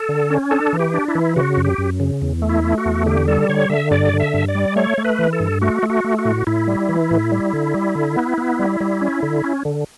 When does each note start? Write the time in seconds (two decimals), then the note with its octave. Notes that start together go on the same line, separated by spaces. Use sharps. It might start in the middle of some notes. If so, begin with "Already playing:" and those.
Already playing: A4
0.09 D3
0.30 C#4
0.51 D4 A4
0.73 E3
0.79 G4
0.94 D4
1.08 E4
1.15 E3
1.36 C#3 F#4
1.57 F#2
1.64 G4
1.78 F#2
2.00 C#3
2.22 E2
2.42 A3
2.49 E4
2.64 A3
2.78 F#4
2.85 E2
3.06 D3 G4
3.28 G3 A4
3.49 D3 C#5
3.70 D3 E5
3.91 G2 D5
4.13 D3
4.20 E5
4.34 G2
4.48 D5
4.55 G3
4.76 A3 C#5
4.98 A3
5.04 B4
5.19 E3
5.33 A4
5.40 G2
5.61 A3 F#4
5.83 A3
5.90 F#4
6.04 A3
6.19 F#4
6.25 A2
6.47 A2 E4
6.68 G3
6.89 E3
7.11 A2
7.32 G3
7.53 D3
7.74 G3
7.95 D3
8.17 B3
8.38 B3
8.59 G3
8.80 G3
9.01 C#4
9.23 D3
9.44 C#4
9.65 D3